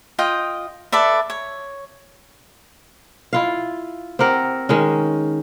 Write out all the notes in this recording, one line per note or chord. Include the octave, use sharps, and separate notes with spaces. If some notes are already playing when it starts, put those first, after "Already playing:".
F4 D#5 G5
A4 B4 D5 E5
C#5
E4 F4 F5
C4 G4 A#4 F#5
D#3 G#3 C#4